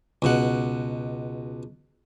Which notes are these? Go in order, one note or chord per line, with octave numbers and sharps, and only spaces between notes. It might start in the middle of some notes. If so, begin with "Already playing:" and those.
C#2 B2 F#5